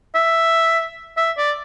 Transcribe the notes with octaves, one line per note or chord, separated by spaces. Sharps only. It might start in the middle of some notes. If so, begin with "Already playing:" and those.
E5
E5
D5